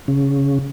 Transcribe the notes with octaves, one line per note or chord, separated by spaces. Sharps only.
C#3